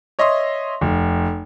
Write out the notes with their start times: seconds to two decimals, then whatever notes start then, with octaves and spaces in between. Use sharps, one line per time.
0.19 C#5 D#5 E5 C6
0.81 F1